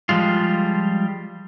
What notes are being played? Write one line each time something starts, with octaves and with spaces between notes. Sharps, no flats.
F3 G3 G#3 F4